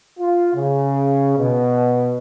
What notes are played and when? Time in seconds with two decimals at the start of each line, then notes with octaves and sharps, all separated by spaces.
0.19 F4
0.55 C#3
1.38 B2